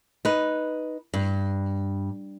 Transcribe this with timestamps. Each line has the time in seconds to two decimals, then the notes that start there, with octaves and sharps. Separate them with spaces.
0.25 D#4 B4
1.14 G2